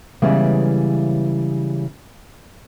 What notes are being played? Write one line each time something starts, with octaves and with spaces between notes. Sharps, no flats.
C#3 E3 G3 G#3 B3 C#4